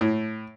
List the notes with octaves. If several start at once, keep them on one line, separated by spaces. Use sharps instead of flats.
A2